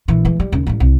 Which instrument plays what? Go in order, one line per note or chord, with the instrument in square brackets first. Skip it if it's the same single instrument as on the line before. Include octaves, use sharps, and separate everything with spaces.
[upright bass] A#1 E3
E3 G#3
G3
D#2 C#3
A1 G3
C2